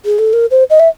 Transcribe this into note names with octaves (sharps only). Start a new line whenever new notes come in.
G#4
A4
A#4
C5
D#5
E5